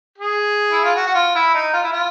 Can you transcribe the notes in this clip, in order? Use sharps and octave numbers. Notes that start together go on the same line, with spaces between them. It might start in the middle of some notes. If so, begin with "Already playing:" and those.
G#4
E4
F4
F#4
F#4
F4
E4
D#4
F4
E4
F4